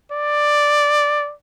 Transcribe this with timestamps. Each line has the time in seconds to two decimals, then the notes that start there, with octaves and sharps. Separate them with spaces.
0.12 D5